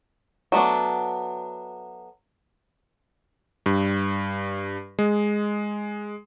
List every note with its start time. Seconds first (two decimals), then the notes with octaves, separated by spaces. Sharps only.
0.52 F#3 A3 B3 D4
3.66 G2
4.99 G#3